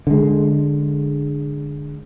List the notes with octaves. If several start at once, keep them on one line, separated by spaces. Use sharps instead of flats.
D3 G#3